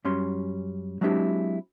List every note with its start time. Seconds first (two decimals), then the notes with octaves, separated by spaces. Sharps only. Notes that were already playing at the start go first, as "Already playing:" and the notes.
0.05 F#2 G3 C#4 C6
1.01 F#3 G#3 C4 D4 E4 G4